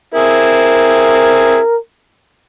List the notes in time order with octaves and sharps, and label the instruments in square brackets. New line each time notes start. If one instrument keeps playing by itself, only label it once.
[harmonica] C4 E4 G#4 [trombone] A#4